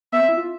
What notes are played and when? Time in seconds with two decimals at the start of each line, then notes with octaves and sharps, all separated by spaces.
0.12 B3 E5
0.20 C4
0.29 E4
0.37 F4